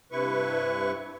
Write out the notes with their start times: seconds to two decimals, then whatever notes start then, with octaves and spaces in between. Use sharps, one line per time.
0.12 G2 C3 E4 B4 C#6